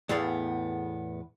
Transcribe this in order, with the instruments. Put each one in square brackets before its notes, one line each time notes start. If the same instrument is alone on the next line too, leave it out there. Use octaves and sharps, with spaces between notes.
[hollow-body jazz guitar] E2 A2 B3 G#4 D5 F5